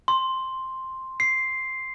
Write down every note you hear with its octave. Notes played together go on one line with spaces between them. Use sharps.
C6
C7